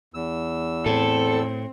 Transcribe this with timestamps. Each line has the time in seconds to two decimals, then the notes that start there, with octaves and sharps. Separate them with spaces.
0.14 E2 E6
0.86 A2 C4 A4